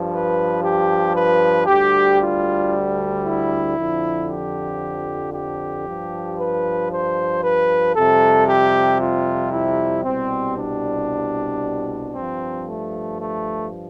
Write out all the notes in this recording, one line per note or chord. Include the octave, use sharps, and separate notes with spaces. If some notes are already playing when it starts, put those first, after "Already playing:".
Already playing: G2 F3
B4
G4
B4
D2 D3 G3 G4
F4
E4
F2 D3 F3
G4
G4
G2 F3
B4
C5
B4
F2 C3 G3 A4
G4
F4
E4
C2 B2 G3 C4
D4
G2 F3 C4
A3
A3